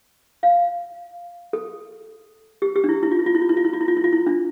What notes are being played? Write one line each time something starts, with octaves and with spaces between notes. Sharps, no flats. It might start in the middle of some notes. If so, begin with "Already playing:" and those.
F5
A4
G4
G4
D4
E4
E4
F4
E4
F4
E4
F4
E4
F4
E4
F4
E4
F4
E4
F4
E4
D4